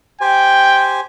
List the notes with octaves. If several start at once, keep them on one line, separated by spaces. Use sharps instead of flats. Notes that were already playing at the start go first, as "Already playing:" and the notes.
G4 C5 G5 G#5